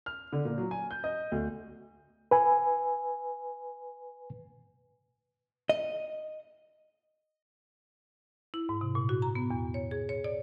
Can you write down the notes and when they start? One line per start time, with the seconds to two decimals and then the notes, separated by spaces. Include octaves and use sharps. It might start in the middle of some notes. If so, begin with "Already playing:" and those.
0.06 F6
0.33 D3
0.45 A#2
0.58 F#3
0.71 G#5
0.91 G6
1.04 D#5
1.32 D2
2.31 B4 G#5
5.69 D#5
8.54 E4
8.69 G#2
8.81 C3
8.95 A#2
9.09 F#4
9.22 A#5
9.35 B3
9.51 E2
9.74 C#5
9.91 G#4
10.09 C#5
10.24 D5